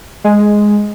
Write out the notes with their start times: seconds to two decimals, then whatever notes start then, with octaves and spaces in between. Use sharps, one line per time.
0.24 G#3